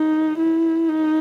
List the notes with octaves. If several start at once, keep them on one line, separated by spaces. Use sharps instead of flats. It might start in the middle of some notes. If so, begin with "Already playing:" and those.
Already playing: D#4
E4
D#4